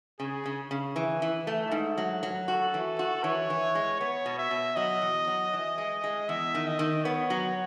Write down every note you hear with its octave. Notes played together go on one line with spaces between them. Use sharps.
C#3 G#4
C#3
C#3
E3
E3
A3
G#2
F#3
F#3
F#4 A4
E3
F#4
E3 C#5
E3
G#3
B3 C#5
B2
E5
B2
F#3 D#5
E2
F#3
E3
G#3
G#3
E2 E5
D#3
D#5
D#3
B3 C#5
F#3